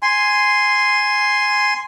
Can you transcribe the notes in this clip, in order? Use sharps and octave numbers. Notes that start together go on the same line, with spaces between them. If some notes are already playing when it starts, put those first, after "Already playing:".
G#5 C6